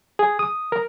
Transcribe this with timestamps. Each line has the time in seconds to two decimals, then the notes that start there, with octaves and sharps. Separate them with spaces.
0.19 G#4
0.39 D#6
0.72 A#4